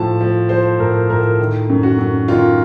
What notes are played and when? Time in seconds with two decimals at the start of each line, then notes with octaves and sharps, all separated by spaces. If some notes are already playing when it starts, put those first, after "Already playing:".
Already playing: A2 F3 A5
0.21 F3
0.49 F3 C5
0.79 A2 A#4
1.10 A2 A#4
1.40 D#3
1.69 F#2
1.83 F#4
1.99 F#2
2.28 D#3 F4